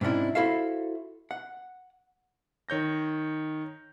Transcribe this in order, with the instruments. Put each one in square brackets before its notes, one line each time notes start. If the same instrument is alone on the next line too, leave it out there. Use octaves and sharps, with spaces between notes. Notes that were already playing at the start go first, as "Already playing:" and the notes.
[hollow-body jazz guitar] G#2 C3 C#4 D4 E4
E4 F#4 A4 C5 E5 F5
F#5
[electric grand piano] D#3 C#5 G6 A#6